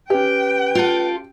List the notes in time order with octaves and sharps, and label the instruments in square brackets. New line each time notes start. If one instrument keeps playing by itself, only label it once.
[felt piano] C#4 G4 [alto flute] B4 [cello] G5
[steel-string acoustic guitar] F4 A4